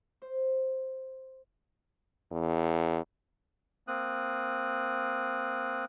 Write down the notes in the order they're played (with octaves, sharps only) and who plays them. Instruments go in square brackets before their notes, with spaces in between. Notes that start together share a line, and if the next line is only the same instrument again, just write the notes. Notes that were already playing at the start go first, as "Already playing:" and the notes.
[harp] C5
[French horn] E2
[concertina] A#3 C4 D#6 F#6